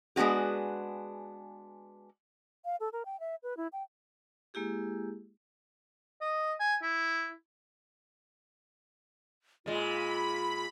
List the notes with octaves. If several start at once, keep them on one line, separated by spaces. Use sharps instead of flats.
G#3 B3 D4 F#4 G#4
F5
A4
A#4
G5
E5
B4
E4
G5
G#3 A#3 E4 G4 G#4
D#5
G#5
E4
A#2 G#3 F4 B5